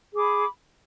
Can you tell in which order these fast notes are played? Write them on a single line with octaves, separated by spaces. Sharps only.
G#4 D6 B5